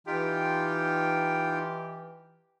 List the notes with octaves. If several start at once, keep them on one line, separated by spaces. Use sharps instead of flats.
E3 D#4 F4 G4 G5